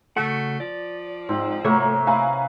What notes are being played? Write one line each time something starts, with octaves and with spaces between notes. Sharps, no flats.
C#3 A3 F#4 F#5
F3 D5
G#2 C4
C3 F#3 A3 A#3 B4 C#5
B4 E5 F5 G#5 A#5